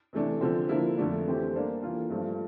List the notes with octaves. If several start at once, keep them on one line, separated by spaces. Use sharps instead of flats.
C3 E3 A3 D4
D3 F3 C4
D3 F3 A#3 E4
F2 D3 A3 D4
E3 A3 C4 G4
G3 A#3 D4 A4 C5
E3 A#3 F4 A4
G2 F3 A3 D4